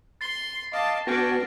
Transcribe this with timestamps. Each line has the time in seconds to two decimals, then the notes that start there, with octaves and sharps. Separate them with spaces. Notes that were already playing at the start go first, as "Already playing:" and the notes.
0.21 C6 A6 C7 G7
0.73 D#5 F5 A5 D6
1.07 B3 D4 F#4 G5 G#5 C#6 F6 A#6